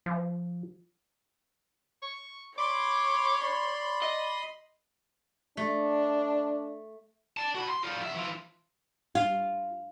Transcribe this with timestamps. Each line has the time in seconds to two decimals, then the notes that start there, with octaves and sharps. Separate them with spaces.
0.06 F3
2.02 C#6
2.58 C#5 B5 C6 D6
3.41 D5
4.02 D#5
5.57 A3 D4
7.37 D5 A5
7.55 F#4 B5
7.69 C6
7.83 G3 F4
8.00 F2 E5
8.15 E3 F4
9.15 F4